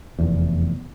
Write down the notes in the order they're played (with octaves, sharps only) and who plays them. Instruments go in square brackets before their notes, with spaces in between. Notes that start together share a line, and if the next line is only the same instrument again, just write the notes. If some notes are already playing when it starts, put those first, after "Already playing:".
[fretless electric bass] F1 E2